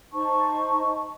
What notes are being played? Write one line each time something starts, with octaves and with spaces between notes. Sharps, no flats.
D#4 C5 A5 C#6